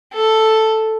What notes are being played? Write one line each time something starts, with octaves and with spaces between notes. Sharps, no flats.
A4